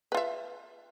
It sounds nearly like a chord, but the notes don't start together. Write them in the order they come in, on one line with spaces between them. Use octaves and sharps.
B4 F4 E5